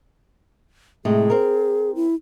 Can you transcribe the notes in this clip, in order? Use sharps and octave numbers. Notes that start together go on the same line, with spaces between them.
A2 C3 G#3 G#4
C4 A#4
E4